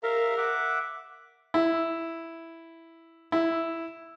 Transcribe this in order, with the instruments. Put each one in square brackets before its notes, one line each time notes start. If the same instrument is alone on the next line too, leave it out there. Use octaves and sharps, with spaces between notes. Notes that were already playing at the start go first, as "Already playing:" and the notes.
[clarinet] A#4 [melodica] E5 F5 A#5
[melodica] E5 F#5 D6
[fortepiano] E4
E4